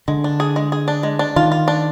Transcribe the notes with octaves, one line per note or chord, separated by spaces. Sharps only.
D3 G#3
D4
G#4
G#3
G#4
D4
G#3
D4
D#3 F4
F4
D4